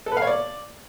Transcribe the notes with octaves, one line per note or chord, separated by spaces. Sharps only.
A4
B4
F5
C#5
D5